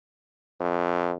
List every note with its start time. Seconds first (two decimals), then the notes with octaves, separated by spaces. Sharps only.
0.61 F2